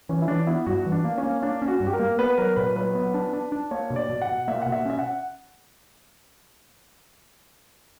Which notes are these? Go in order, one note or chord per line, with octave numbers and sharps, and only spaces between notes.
E3 C#4
E4
E3 D4
B3 E4
G2 F#4
E3
D4
A#3
C#4
A#3
A#3 D4
C#4
F#4
G2
G4
A#4
A#3
B3 B4
F#3 A#4
A#2 B4
F#3 B4
B3
D4
D4
D4
A#3 C#5
B2
D5
B2
F#5
B2
A#3 E5
B2 F#5
E5
C#4 E5
F#5